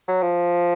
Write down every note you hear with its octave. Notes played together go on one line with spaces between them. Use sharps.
F#3
F3